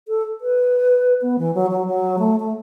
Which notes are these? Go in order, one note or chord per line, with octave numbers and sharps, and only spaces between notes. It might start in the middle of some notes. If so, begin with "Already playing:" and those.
A4
B4
B3
E3
F#3
F#3
F#3
A3
A3